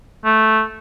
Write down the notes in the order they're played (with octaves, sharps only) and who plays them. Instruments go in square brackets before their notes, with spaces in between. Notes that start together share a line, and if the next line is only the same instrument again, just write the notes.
[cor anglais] A3